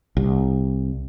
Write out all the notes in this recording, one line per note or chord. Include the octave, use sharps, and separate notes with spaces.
C2